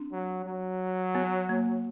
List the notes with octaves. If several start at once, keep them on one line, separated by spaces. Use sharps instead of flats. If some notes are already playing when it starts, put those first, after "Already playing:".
Already playing: C4 D4
F#3
F#3
B3
A#3